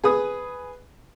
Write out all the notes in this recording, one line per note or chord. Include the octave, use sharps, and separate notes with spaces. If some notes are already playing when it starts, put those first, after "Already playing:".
G#4 B4 D#6